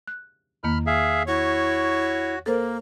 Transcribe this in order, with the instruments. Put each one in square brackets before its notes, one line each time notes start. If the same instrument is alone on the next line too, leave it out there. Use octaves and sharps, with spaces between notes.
[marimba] F#6
[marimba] E2 D#3 A#3 [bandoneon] B5 F6
[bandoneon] G#4 E5 F5
[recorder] E4 [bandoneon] F#4 [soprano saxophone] C#5
[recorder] A#3 [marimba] A4 A#4 C5